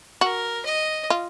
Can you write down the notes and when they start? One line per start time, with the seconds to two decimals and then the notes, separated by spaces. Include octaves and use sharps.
0.21 F#4 A#4
0.65 D#5
1.10 F4